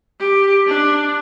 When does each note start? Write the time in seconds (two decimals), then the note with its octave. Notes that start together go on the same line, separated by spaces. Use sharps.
0.20 G4
0.67 D4